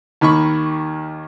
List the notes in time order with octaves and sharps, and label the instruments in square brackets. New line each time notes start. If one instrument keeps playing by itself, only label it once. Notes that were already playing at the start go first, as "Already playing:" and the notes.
[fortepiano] D#2 D#3 B5 C#6